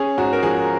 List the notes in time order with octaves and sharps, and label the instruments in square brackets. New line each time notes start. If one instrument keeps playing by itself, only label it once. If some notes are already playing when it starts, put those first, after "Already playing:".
Already playing: [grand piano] C#4 G#4
G#2 F#4
A#4
F3 G#4